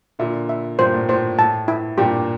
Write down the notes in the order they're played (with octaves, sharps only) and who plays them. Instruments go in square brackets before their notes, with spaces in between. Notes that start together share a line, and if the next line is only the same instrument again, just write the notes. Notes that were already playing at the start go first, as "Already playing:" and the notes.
[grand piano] A#2 D3 [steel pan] E5
[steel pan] E5
[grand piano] G2 A#2 [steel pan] C5
[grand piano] A2
[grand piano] A2 [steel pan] C5
[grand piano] A2 [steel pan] A5
[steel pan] E4
[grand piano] G2 A#2 [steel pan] G4